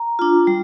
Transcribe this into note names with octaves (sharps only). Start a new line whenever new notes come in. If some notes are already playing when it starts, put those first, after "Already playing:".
Already playing: A#5
D4 F4
G3